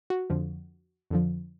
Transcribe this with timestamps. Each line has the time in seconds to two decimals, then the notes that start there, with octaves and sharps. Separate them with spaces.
0.10 F#4
0.30 F2 D3 F3
1.11 F2 D3 F3